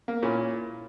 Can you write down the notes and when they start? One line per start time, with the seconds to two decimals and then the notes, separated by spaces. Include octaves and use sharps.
0.08 A#3
0.23 A#2 C#4 E4